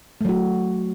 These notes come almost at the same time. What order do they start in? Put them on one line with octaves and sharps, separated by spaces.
A3 F#3 F#4